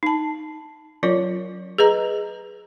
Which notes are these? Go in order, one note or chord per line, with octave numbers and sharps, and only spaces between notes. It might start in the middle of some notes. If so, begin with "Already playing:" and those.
D#4 A5
F#3 C#4 F4 A#4 C#5
G#4 B4 D#5 A#5